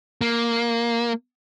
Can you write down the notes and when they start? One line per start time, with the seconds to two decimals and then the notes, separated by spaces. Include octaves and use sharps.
0.21 A#3